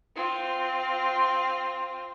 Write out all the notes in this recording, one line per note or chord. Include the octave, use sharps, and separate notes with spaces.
C4 F4